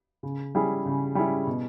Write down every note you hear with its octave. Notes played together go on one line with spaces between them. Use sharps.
C#3
G3 C#4 E4 G#4
C#3
G3 C#4 E4 G#4
B2